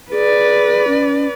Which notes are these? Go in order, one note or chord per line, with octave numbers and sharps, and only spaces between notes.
G#4 B4 D5
C#4